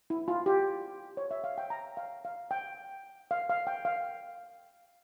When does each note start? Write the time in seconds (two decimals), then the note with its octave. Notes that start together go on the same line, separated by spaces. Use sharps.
0.10 E4
0.28 F4
0.46 G4
1.17 C#5
1.31 E5
1.44 F5
1.58 G5
1.70 A#5
1.97 F5
2.25 F5
2.51 G5
3.31 F5
3.50 F5
3.67 G5
3.85 F5